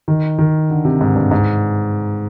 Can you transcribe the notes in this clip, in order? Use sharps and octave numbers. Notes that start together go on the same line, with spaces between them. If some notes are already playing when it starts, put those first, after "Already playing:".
D#3
D#3
D3
C3
G#2
G2
G#2